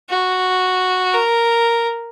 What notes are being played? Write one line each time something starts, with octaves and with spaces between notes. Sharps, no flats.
F#4
A#4